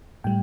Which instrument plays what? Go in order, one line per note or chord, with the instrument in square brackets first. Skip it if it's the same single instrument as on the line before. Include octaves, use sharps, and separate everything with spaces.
[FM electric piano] A2 G3 G5